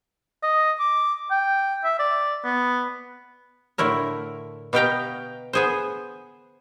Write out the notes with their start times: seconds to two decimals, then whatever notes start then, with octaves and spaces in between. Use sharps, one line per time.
0.43 D#5
0.79 D6
1.31 G5
1.84 E5
1.99 D5
2.44 B3
3.78 A2 D3 A3 E4 A#4
4.73 B2 B3 G4 F5 G5 A#5
5.53 B3 G#4 C5